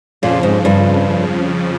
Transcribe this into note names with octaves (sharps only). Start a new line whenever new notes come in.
F2 A#2 C#3 F3
G#2
G2